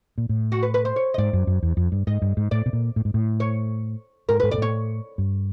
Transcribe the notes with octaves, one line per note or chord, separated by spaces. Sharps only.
A#2
A2
F#4
B4
B4
C5
C#5
D#5
G#2 D5
F#2
F#2
E2
F2
G2
G#2 D#5
G2
G#2
A2 D5
B2
A#2
A2
G#2
A2
C#5
G#2 A#4
G#2 B4
A#2 D5
A2 C#5
G2